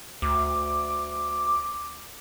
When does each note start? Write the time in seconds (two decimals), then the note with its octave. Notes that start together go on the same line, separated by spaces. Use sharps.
0.22 D2 D6